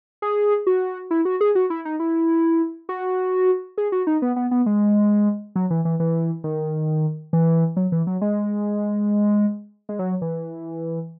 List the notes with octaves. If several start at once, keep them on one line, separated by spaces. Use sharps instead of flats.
G#4
F#4
E4
F#4
G#4
F#4
E4
D#4
E4
F#4
G#4
F#4
D#4
B3
B3
B3
G#3
F#3
E3
E3
E3
D#3
E3
F#3
E3
F#3
G#3
G#3
F#3
E3